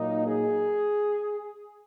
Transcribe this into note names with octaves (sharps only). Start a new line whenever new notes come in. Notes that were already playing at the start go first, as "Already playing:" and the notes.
Already playing: A#2 F#3 A#3 D#4
G#4